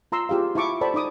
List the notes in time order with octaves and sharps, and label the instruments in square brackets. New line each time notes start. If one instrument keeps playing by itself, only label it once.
[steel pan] F4 A#5 C6 E6
F4 G4 G#4 F5
E4 E5 A5 C#6 D6
A4 C5 D5 G5 A5 B5
D#4 D5 D6 D#6